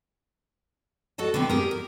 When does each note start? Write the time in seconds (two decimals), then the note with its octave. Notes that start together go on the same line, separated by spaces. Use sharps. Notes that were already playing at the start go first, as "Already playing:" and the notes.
1.18 F#4 A4 D#5 A5
1.34 D3 F#3 B3 C4
1.49 G4 G#4 A#4
1.71 A#4